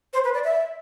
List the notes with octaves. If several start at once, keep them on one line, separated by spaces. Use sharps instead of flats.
C5
B4
D5
E5